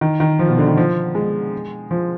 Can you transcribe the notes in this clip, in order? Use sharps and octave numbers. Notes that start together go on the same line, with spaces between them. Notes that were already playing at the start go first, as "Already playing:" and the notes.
D#3
D#3
F3
B2
D3
D#3
F3
G#3
F3